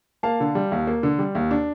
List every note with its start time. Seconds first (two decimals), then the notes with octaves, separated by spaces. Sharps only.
0.23 A#3 F5 A5
0.40 D3
0.55 G3
0.72 D#2
0.87 A#3
1.03 D3
1.19 G3
1.35 D#2
1.51 D4